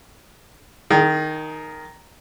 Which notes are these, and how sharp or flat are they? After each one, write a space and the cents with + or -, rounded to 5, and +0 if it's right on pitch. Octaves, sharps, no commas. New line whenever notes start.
D#3 +0 G#4 +30